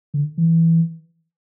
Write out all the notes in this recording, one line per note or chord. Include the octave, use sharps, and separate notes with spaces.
D3
E3